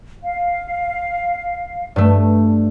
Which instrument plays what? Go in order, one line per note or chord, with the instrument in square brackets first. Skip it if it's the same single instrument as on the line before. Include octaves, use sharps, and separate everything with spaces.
[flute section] F5
[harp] G2 A3